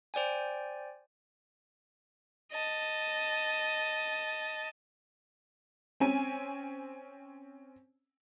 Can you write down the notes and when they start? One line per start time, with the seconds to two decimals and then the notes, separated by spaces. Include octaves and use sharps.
0.14 C5 D5 G5 G#5
2.52 D#5 A5
6.00 C4 C#4 G#5